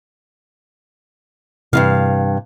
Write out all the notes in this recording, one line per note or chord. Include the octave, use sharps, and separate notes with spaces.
G2 C3 D#3 E3 F5